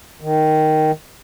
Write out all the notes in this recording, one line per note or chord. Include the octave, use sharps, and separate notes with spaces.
D#3